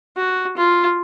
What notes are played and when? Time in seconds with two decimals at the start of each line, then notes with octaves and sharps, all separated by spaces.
0.17 F#4
0.57 F4